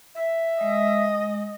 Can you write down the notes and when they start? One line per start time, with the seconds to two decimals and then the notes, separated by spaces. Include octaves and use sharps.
0.15 E5
0.61 G#3 D#5